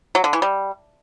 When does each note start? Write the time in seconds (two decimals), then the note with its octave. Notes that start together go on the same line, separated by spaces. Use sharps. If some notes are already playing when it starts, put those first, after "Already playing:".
0.15 F#3
0.24 D3
0.33 E3
0.42 G3